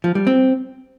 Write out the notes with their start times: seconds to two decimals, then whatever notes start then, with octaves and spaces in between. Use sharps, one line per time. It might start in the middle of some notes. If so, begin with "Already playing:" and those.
0.04 F3
0.15 G3
0.27 C4